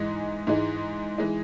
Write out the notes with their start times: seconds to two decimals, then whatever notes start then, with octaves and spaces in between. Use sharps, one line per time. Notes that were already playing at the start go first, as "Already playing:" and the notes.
Already playing: G#2 E3 G#3 D#4
0.47 G#2 E3 G#3 D#4
1.18 E3 G#3 D#4